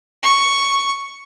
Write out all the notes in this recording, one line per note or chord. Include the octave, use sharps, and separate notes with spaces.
C#6